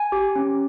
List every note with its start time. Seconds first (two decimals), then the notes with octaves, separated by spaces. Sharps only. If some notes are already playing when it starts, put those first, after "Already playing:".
Already playing: G#5
0.12 G4
0.36 C#4